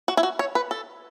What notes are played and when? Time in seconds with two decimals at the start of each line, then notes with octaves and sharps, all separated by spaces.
0.08 F#4
0.17 E4
0.23 F#4
0.39 C#5
0.55 B4
0.71 A4